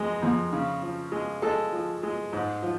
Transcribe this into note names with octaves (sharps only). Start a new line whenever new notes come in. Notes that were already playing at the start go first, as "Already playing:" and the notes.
Already playing: F2 G#3
F2
C#3
F3
G#3
G#3 A4
F3
G#3
G#2
F3